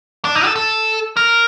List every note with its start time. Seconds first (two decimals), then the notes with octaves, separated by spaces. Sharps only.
0.25 D4
0.35 D#4
0.45 A4
0.56 A4
1.17 A#4